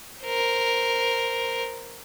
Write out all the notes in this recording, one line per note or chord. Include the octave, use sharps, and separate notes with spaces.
A#4 C5